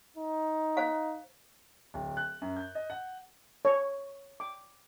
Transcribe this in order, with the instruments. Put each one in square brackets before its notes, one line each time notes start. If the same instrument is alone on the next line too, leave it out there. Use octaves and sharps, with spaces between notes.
[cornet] D#4
[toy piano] C5 F5
[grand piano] D1
F#6
F#2
G6
D#5
F#5
[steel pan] C#5
D6